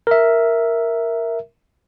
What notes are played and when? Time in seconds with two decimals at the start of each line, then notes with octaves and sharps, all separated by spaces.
0.07 A#4 E5